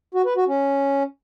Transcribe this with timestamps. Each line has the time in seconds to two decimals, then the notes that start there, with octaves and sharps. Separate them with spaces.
0.15 F#4
0.26 B4
0.37 F#4
0.48 C#4